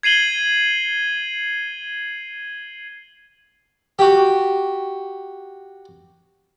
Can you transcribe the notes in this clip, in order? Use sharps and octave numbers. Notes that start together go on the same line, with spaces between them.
G#6 C7 D#7 F#7 G7
F#4 G4